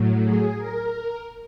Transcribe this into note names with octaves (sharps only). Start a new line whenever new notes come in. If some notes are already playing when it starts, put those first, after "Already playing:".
Already playing: A2 F#3
G#4
A#4